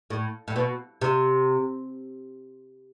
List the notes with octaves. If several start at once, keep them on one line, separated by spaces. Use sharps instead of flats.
A2
A2
B2
C3